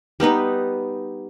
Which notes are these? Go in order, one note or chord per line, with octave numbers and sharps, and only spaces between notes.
G3 B3 D#4 B4